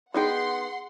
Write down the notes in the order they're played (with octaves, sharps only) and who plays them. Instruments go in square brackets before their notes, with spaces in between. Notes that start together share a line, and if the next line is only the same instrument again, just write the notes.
[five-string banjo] B3 D#4 G5 [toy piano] F#4 G#4 [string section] F#5 C6